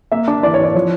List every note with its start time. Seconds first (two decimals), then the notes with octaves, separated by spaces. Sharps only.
0.12 A#3 E5
0.28 D4
0.43 E3 D5
0.54 C#5
0.60 E3 D5
0.74 F3 C#5